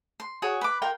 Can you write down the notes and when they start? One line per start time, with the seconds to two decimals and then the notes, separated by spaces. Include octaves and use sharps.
0.20 C6
0.42 F#4 G#4 C#5
0.61 B4 D6
0.82 F4 A#4 G5